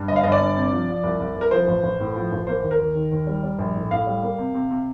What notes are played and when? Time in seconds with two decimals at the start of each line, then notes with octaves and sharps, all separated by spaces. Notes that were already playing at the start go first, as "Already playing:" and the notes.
Already playing: G2
0.08 G1 D#5
0.16 F5
0.23 G1 D#5
0.32 D5
0.40 G2
0.56 C3
0.72 F3
0.89 F3
1.04 C2
1.20 C2
1.36 C2
1.41 A#4
1.51 F3 C5
1.67 A1
1.83 A1
2.00 A2
2.16 F3
2.32 A1
2.47 A#3 C5
2.63 D#2
2.71 A#4
2.80 D#2
2.95 D#3
3.12 D#2
3.27 G3
3.43 G3
3.59 A#1
3.76 A2
3.91 A2 F5
4.07 G3
4.22 A#3
4.38 C3
4.54 C3
4.71 C3